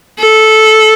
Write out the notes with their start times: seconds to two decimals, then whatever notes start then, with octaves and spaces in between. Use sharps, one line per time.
0.19 A4